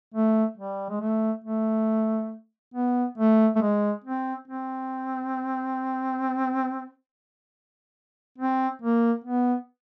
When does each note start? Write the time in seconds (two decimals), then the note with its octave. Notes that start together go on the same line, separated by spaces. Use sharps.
0.14 A3
0.57 G3
0.90 G#3
1.01 A3
1.44 A3
2.74 B3
3.18 A3
3.56 A3
3.62 G#3
4.04 C4
4.48 C4
8.38 C4
8.82 A#3
9.24 B3